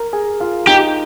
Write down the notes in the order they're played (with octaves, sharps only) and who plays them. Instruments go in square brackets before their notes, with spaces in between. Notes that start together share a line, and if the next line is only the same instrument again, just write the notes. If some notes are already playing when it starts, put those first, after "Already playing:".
Already playing: [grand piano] A#4 A#5
G#4 G#5
F4 F5
[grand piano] D#4 D#5 [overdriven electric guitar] G4